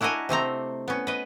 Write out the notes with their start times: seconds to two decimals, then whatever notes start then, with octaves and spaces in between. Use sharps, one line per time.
0.01 D4 E4 F#4 A#4 D#5 G#5
0.29 C3 A3 C4 A#5
0.88 B3 C#4
1.07 B4 D#5